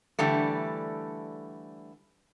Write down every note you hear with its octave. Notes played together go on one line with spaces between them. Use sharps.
D3 E3 G3 A3